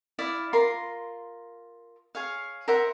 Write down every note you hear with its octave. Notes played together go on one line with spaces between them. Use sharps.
E4 D5 F5
F4 A#4 C6
G#4 C#5 F5
A#4 C5 E5 F#5